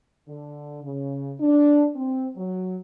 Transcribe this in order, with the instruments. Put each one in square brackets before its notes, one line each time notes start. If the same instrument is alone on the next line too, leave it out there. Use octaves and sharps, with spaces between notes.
[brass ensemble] D3
C#3
D4
C4
F#3